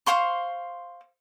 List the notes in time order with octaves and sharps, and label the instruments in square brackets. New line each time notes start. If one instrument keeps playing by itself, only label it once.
[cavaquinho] C5 F5 C6 C#6